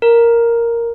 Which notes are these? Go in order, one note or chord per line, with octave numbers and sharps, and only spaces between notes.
A#4